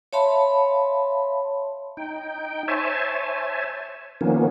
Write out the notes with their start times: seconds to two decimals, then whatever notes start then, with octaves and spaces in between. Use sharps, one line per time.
0.13 C#5 E5 F5 A5 B5 C6
1.97 D#4 G5
2.68 C5 C#5 E5 G#5 A5
4.21 D#3 F3 A#3 B3 C#4